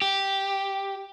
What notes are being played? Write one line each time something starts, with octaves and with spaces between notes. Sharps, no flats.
G4